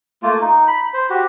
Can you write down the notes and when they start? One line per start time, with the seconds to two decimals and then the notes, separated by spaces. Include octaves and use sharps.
0.23 A3 A#3 F4
0.41 D#4
0.68 B5
0.94 C5
1.10 F#4 G4